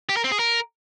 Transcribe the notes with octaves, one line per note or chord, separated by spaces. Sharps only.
G4
A#4
C4
G#4
A#4